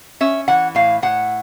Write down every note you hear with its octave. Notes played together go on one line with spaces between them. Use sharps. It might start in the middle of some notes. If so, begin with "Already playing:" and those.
C#4 E5
E3 F#5
A2 F5
A2 F#5